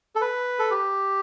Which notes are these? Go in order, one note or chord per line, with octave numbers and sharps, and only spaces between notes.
A4
B4
A4
G4